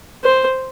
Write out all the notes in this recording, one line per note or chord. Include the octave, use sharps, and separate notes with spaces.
C5